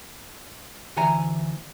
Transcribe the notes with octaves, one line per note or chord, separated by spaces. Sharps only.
D2 E3 F#5 G#5 A#5